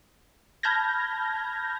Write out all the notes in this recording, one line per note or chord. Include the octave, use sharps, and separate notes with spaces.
A5 B5 F6 G6 G#6 A#6